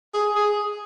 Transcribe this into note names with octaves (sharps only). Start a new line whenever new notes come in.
G#4
G#4